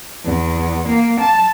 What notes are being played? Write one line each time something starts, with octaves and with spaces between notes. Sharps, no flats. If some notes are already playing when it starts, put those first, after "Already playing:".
E2
A#3
A5